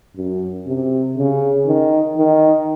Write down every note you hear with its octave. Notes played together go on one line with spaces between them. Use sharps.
F#2
C3
C#3
D#3
D#3